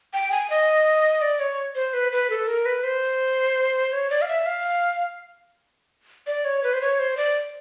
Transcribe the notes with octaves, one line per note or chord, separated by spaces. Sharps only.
G5
G#5
D#5
D5
C#5
C5
B4
B4
A4
A#4
B4
C5
C#5
D5
F5
E5
F5
D5
C#5
B4
C5
C#5
C5
D5